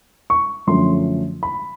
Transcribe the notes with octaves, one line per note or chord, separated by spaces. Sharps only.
C#6
F#2 D3 F3 A3 C#4 C6
B5